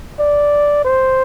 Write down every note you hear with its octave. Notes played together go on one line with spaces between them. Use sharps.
D5
C5